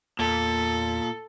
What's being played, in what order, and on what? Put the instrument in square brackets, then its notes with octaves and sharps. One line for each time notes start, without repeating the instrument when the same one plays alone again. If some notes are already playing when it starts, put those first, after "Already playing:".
[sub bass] E2 [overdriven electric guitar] A#2 [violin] A4